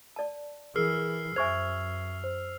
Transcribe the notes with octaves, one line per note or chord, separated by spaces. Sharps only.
D5 A5
E3 G#4 A#4 E6 F6 C7
F#2 C5 E5 G#5 C#6 G#6 F7
C5